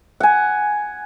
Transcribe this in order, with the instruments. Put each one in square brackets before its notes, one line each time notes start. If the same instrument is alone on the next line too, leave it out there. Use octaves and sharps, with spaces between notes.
[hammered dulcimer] F#5 G#5